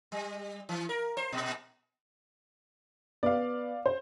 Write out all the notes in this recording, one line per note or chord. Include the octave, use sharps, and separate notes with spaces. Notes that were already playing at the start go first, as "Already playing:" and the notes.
G3
E3
A#4
C5
A#2
B3 D5 F5
C5